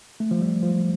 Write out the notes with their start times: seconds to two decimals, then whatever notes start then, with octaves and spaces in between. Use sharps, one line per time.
0.20 A3
0.31 F3
0.41 G3
0.63 F3